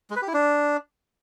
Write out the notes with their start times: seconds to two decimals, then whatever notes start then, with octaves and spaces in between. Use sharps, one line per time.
0.10 G#3
0.16 B4
0.22 G4
0.28 E4
0.34 D4